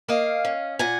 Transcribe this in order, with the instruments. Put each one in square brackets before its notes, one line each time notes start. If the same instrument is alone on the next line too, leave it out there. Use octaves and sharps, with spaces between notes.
[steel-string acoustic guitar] A#3 D#5 F5
C#4
A#2 F#5 G#5